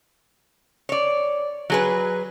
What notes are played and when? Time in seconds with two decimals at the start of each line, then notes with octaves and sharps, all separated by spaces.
0.89 C#5 D5
1.70 F#3 G#4 B4